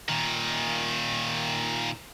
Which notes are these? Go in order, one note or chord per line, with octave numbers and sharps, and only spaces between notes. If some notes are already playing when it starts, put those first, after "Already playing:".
A#2 D#3